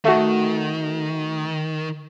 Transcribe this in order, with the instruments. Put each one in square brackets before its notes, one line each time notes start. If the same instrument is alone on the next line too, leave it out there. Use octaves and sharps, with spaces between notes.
[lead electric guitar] D#3 [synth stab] A3 F#4